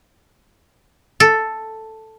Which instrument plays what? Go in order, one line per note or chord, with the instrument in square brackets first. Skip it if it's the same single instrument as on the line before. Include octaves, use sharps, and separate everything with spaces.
[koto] A4